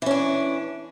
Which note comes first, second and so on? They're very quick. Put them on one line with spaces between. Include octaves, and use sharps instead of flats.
E3 C#4 D4